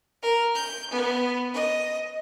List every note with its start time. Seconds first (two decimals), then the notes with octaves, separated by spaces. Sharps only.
0.22 A#4
0.55 G6
0.90 B3
1.53 D#5